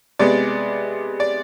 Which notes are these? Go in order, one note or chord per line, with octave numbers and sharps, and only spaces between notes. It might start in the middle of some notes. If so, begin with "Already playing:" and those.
C3 G#3 B3 D5
D5